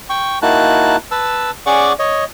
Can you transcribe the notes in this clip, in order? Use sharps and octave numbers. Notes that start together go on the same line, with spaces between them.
G5 C#6
A#3 D#4 E4 F#4 A5 F#6
B4 A5 E6
C#4 G#4 D5 F#5 C#6 D6
C#5 D#5